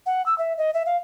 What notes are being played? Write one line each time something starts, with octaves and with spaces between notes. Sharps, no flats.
F#5
E6
E5
D#5
E5
F5